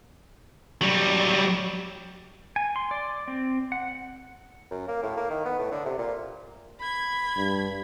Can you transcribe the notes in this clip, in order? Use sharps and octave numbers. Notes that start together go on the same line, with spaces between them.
F#3 G3
G#5
C6
D5
C4
F#5
F#2
A#3
A2
A#3
D#3
B3
A2
D3
C3
A#2
B5 G#6
G2